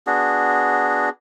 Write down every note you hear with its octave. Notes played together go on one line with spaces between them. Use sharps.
B3 D4 F#4 G#4